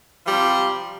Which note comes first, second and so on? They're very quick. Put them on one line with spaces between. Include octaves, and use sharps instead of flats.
F3 G3 C3